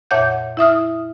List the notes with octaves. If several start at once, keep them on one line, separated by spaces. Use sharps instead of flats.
F2 A#2 C#5 E5 F#5 G6
E4 E5 D#6 F6